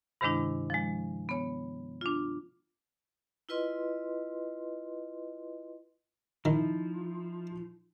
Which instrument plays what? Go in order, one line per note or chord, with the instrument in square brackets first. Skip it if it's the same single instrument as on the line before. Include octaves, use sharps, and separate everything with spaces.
[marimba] G2 C3 D#3 G#3 D4 E4
F3 G#3
B3 C#5
D4 F4
[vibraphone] E4 F4 B4 D#5 C6
[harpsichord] D#3 [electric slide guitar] F3 [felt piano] D#4 E4